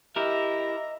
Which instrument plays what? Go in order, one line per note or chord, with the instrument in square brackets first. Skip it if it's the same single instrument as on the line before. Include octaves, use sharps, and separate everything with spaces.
[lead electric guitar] E4 A#4 [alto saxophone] G4 [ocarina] D#5 [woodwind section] E5 A#5